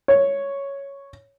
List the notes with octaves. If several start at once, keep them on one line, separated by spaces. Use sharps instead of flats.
C#5